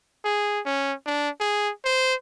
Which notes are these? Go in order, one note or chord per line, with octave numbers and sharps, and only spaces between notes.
G#4
C#4
D4
G#4
C5